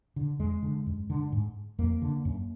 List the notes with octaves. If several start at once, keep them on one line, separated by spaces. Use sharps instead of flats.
D3
F2 G#3
D3
F#2
D3
G#2
F2 A#3
D3
F#2